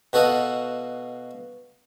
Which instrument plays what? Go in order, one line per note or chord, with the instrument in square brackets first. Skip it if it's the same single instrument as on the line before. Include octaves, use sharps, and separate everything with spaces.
[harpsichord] B2 F#4 A4 D#5 F5